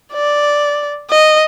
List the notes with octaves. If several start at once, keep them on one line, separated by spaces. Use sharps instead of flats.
D5
D#5